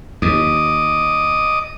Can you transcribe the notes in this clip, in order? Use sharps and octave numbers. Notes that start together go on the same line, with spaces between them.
D#2 D#5 D6 D#6